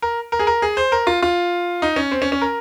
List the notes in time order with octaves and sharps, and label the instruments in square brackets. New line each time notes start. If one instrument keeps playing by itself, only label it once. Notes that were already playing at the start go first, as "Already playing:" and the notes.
[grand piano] A#4
A#4
G#4
A#4
G#4
C5
A#4
F4
F4
D#4
C#4
C4
C#4
C#4
A#4